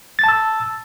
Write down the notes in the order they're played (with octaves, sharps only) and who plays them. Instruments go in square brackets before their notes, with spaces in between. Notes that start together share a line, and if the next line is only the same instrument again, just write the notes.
[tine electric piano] A6
A5
E6